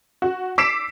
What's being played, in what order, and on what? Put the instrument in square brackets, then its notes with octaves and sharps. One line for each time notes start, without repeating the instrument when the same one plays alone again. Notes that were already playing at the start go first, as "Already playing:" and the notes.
[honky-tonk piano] F#4
D6 E6 B6 C7 D7 E7